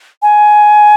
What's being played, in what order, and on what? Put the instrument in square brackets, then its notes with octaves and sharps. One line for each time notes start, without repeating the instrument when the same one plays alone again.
[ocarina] G#5